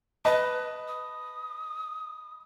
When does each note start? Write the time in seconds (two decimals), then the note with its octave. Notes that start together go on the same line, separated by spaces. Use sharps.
0.25 B4 D#5 A5 B5
0.88 D#6